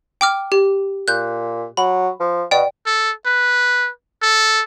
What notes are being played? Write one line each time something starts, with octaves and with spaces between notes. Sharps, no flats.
G5 D6 F6
G4
A#2 F#6 G6
F#3 B5
F3
B2 D5 G5
A4
B4
A4